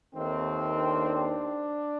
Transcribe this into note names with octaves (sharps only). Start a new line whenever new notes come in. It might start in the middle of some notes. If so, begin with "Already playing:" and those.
D#2 D#3 A3 C4
D4